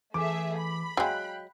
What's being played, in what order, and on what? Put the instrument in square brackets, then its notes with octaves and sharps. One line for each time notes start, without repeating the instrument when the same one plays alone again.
[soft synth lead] E3 [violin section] A3 G#4 E5 [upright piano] D6
[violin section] B5
[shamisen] F#3 G#3 [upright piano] F5 G5 [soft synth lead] F#6